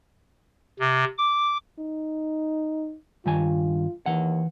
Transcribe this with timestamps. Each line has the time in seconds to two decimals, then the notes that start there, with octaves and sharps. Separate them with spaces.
0.80 C3
1.18 D6
1.79 D#4
3.26 G2 D#3 F4 G#5
4.06 D#2 E3 F#5